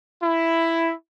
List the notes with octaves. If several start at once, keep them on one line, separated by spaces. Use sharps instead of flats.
E4